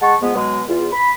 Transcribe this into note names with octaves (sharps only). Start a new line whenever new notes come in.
G#3 F#5 A5 C#6
F3 G#3 B3
B2 F#3 G#3
E2 F4
B5